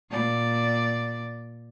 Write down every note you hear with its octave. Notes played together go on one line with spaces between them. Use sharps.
A#2 D5